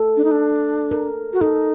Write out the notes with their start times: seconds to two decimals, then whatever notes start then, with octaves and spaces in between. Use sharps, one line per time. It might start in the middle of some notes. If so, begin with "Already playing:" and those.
Already playing: A4
0.17 D4
0.24 D#4
0.31 D4
0.91 A#4
1.33 F#4
1.41 D#4 A4